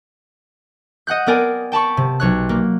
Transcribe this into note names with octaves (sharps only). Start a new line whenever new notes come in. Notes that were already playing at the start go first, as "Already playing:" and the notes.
D#5 F#5 F#6 G6
B3 C4 A#4 D5 G5 G#5
G5 A5 B5 C#6
C3
B1 C#5 F#6
A#3